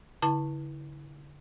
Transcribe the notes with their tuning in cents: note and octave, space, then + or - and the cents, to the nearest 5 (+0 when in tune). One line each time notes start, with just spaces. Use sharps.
D3 -40 E4 -20 A5 +15